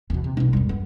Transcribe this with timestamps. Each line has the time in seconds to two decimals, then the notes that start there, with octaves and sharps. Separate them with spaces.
0.10 D#2 B2 E3
0.24 C3
0.37 B1 C#4 D4
0.53 E2 G2 G3
0.69 B3